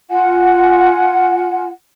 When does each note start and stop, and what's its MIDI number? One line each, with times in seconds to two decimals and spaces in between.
0.10 1.68 65
0.10 1.68 78
0.10 1.68 80